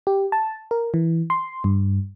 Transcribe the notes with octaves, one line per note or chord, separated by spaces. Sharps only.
G4
A5
A#4
E3
C6
G2